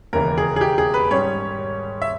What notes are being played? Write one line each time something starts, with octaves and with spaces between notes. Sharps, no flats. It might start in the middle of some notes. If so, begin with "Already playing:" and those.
E1 D#2 C#3 E3 A#4
G#4
G#4
G4
G#4
B4
G#2 G3 C#4 C#5
E5